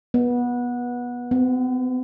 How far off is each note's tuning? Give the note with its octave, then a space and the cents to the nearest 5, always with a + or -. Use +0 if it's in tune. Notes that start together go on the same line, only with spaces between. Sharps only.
B3 -20
B3 +45